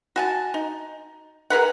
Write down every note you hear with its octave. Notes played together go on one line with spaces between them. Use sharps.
F#4 G#5 A5
D#4
G#4 A#4 B4 F#5